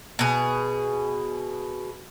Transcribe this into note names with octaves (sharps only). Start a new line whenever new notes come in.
B2 G#4